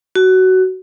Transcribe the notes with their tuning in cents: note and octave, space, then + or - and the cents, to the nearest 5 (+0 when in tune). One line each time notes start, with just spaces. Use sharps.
F#4 +15